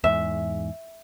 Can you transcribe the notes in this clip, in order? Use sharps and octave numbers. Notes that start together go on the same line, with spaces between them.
E2 G#2 E5